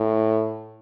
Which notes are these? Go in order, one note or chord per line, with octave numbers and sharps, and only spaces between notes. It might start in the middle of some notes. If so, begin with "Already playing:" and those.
Already playing: A2